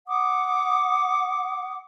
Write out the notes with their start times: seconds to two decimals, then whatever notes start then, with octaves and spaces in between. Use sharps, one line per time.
0.07 F#5 D6 D#6